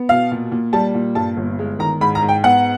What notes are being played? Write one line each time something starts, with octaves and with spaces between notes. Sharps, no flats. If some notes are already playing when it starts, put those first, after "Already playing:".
Already playing: B3
B2 F5
A#2
A#2
G3 A5
A#2
G2 A5
G1
G#3
D#3 A#5
G#2 B5
A#5
G#2
G5
B3 F#5